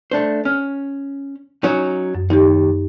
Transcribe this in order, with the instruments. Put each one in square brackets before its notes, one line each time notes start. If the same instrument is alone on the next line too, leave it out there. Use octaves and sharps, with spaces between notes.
[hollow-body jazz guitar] A3 D4 C5
[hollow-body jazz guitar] C#4 [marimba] F6
[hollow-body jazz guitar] F#3 C#4 D#4
[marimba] F#2
[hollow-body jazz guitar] D#2 [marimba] D#4 G4